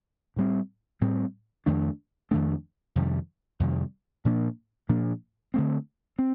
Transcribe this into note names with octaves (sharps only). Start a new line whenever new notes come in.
A2 G3 C4
A2 G3 C4
F2 D#3 A3 D4
F2 D#3 A3 D4
F2 C3 D#3 G3
F2 C3 D#3 G3
A#2 F3 A#3 D4
A#2 F3 A#3 D4
D3 A3 C4
C4